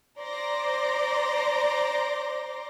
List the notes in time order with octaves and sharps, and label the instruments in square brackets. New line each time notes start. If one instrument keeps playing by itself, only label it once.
[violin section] C5 D5 A#5 C6 D6 A#6